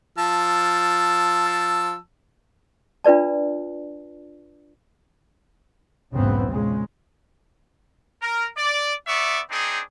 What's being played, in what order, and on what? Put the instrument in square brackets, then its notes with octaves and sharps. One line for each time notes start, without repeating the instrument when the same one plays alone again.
[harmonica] F3 A5 E6
[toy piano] D4 F4 B4 D5 A5
[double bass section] B1 E2 G#2 C#3 B3 C4
A#2 C#3 G#3
[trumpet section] A#4
D5
B3 D5 E5 C#6
C4 D4 D#4 G#4